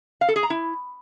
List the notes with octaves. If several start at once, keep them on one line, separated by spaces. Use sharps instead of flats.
F5
A4
G#4
A#5
E4